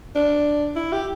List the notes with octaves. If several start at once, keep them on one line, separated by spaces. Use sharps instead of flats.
D4
E4
G4